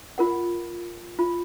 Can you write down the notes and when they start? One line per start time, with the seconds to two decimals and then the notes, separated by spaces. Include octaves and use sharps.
0.18 F4 A#4 F#5
1.19 F4